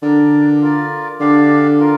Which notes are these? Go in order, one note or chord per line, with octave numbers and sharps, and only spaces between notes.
D3 D4 A#4 D5
F4 A#4 D5
D3 D4 G4 D5 F5
F4 A#4